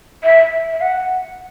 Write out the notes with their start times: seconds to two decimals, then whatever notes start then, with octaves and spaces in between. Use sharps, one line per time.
0.24 E5
0.73 E5
0.81 F#5